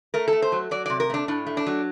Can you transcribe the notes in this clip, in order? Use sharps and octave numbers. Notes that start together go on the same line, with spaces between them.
A3 A#4
A4
A3
C5
F#3
F#3 D5
C3 D5
A#4
A3 D4
A2 D4
A3
D4
F#3